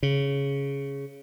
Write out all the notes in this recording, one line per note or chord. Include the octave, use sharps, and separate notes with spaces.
C#3